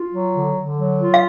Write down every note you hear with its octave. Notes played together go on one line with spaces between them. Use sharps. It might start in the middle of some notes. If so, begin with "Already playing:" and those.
Already playing: F4
F#3
D3
D3
F#3
F4
F5